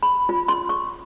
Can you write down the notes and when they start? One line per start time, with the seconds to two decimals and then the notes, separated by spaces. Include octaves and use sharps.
0.03 B5
0.29 F4
0.48 C6
0.69 C#6